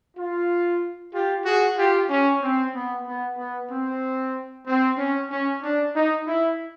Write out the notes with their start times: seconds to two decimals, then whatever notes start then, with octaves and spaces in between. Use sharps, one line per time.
0.17 F4
1.13 F4 G4
1.45 F#4 G#4
1.78 F4 G4
2.10 C#4
2.42 C4
2.75 B3
3.07 B3
3.38 B3
3.71 C4
4.67 C4
4.98 C#4
5.31 C#4
5.63 D4
5.95 D#4
6.27 E4